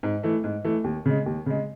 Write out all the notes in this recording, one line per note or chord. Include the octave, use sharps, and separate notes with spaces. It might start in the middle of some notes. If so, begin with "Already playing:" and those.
G#2
E3 A3
G#2
E3 A3
D#2
C#3 G#3
D#2
C#3 G#3